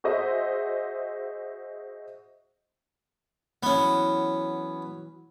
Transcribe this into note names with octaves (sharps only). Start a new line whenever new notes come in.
F#4 G#4 C5 D#5 E5
E3 F#3 B3 C#4